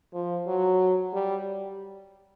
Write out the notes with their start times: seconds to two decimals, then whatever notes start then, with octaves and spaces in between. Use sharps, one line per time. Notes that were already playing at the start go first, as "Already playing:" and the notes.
0.14 F3
0.47 F#3
1.14 G3